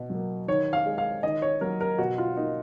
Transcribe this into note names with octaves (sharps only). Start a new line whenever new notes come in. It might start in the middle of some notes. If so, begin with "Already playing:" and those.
Already playing: B2
F#3
A#3
D#3 C#5
F5
G#3
F5
D#3 D#5
C#5
F#3 A#3 A#4
A#4
B2 F#4
F4
A#3 D#4